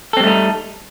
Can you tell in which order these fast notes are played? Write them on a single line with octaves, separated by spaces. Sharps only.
A4 C4 G3 A3 D#4